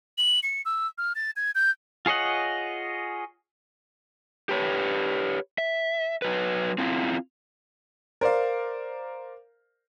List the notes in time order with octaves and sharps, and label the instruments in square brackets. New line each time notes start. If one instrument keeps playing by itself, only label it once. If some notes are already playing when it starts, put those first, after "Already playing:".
[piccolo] F#7
C#7
E6
F6
A6
G#6
G6
[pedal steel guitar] F4 G#4 C#5 D#5 F#5
[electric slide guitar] G4 B4 C#5
E5
F#3 B4
C4 E4 F4
[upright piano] A#4 C5 D5 F5